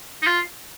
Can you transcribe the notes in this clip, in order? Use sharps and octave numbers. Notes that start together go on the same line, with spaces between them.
D#4
F4